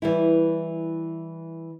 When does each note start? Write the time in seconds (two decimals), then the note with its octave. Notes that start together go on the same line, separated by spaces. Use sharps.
0.02 E3 G3 E4